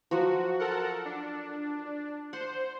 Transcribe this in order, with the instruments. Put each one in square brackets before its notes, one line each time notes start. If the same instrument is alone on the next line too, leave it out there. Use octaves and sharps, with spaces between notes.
[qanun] F3 F#3 [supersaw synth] F#4
[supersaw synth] A4 A#4 F#5
D4
[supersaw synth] C5 [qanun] F#5